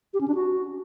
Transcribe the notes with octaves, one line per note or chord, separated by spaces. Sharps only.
G4
C#4
D4
F#4